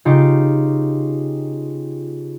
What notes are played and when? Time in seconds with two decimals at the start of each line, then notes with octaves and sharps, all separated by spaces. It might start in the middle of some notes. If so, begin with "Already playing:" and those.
0.05 C#3 D#4 F4 G4